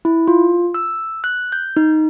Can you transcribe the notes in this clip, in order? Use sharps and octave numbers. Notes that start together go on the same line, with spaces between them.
E4
F4
E6
F#6
G6
D#4